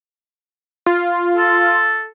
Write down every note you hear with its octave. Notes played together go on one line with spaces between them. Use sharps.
F4
A4